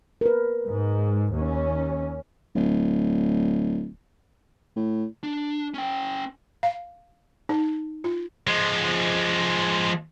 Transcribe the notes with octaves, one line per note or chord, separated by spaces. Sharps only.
A#4 B4
G#2
D#2 C#4
D1
A2
D4
C#4 G5
F5
D#4
F4
F3 G#3